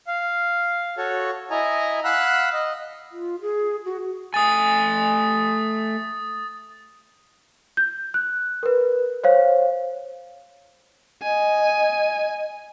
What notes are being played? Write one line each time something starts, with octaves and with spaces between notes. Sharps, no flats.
F5
F#4 A4 C#5
E4 D#5 G#5 A#5
F5 F#5 B5 E6 F#6
D#5
F4
G#4
F#4
A3 G#5 D#6 A6
G6
F#6
A#4 B4
C5 C#5 F5
D#5 G#5